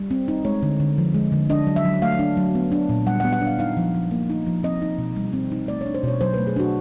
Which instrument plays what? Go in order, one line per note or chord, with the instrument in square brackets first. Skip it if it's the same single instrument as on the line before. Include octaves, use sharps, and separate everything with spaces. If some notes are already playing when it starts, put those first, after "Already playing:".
Already playing: [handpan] G3
C4
D#4
G#3 C#5
D3
D3
F3
G#3
D3
D4 D#5
F#3
E5
F#3
A3 F5
D4
F#3
B3
D4
A#2
G3 F#5
F#5
B3
F#5
D4
F5
D#4 F5
F3
F3
A#3
D#4
F3
C4 D#5
D#4
B2
G3
C4
D#4
A3 D5
C#5
D4
C5
B2 C#5
F#3 C5
B4
A3
G#4
D4 F#4